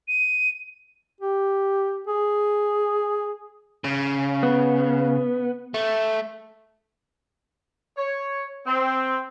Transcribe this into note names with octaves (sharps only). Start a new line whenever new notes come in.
D#7
G4
G#4
C#3
B3
A3
C#5
C4